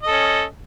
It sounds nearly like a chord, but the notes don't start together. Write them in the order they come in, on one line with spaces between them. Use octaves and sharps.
D#5 A4 C#4